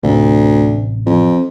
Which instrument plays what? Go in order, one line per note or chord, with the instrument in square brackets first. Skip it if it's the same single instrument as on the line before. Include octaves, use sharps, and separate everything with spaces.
[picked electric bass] A1 C3 [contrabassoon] D2
[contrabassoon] F2